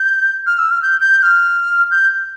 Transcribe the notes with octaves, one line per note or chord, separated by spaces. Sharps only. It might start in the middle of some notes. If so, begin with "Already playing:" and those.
Already playing: G6
F6
E6
F6
G6
G6
G6
F6
G6